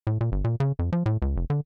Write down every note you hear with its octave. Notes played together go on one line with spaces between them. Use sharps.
A2
A#2
G1
A#2
C#3
F2
F3
A2
C#2
F1
D3